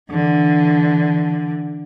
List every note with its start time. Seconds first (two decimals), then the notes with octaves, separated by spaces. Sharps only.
0.11 D3 E3